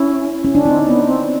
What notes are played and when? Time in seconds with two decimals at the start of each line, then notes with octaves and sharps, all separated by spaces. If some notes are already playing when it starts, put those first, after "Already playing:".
Already playing: C#4 E4
0.45 C#4
0.55 D4
0.65 C4 D#4
0.86 B3
1.06 C4